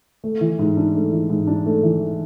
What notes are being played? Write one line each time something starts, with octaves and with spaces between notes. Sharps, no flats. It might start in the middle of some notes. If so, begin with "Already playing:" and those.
A3
E3
G#2
D4
A3
E3
G#2
D4
A3
E3